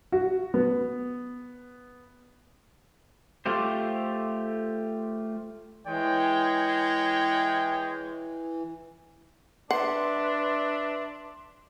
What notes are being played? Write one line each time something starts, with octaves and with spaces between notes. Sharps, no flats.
F#4
B3
A3 F4 G4 C5
E3 G#3 C#5 G5
D4 B4 E5 F#5 C6